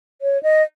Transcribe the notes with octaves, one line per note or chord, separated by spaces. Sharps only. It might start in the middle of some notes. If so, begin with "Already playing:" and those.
C#5
D#5